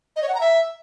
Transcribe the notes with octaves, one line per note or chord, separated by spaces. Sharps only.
D#5
C#5
F#5
A#5
E5